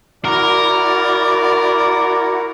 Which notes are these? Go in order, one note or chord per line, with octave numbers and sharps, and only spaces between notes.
E4 F#4 A#4 D5 F#5